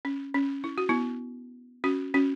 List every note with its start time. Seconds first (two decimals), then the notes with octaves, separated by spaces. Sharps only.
0.05 C#4
0.34 C#4
0.64 E4
0.78 F#4
0.89 B3 E4
1.84 C#4 F#4
2.14 C#4 F#4